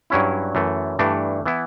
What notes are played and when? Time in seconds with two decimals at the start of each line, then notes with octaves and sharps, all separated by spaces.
0.10 G2 F#3 C#4 E4
0.55 F#2 E3 A3
0.99 G2 E3 A3 D4
1.46 E3 B3 E4